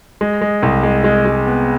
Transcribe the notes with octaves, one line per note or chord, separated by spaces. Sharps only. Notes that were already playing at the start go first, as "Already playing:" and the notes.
G#3
G#3
C2
G#3
G#3
G#3
B3